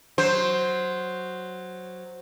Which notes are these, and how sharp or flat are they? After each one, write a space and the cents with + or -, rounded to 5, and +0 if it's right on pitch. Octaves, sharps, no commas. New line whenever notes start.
F#3 +0 C5 +0